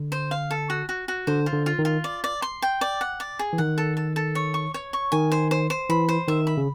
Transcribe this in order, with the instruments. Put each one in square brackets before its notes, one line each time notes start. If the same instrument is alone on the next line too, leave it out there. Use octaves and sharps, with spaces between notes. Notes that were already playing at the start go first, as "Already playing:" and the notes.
Already playing: [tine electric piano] D3
[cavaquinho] C5
F5
A4
F#4
F#4
F#4
[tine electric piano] D3 [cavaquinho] C5
[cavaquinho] F4
[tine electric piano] D3
[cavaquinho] F4
[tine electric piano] D#3
[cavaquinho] F4
D5
D5
C6
G5
D5
F#5
D5
G#4
[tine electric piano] E3
[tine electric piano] D#3 [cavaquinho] F#5
[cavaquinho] A4
A4
A4
C#5
C#6
C#5
C#6
[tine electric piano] D#3 [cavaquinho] G#5
[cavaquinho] C5
C5
C5
[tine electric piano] E3 [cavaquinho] B5
[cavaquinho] C5
[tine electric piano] D#3 [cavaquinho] E5
[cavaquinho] B5
[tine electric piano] C#3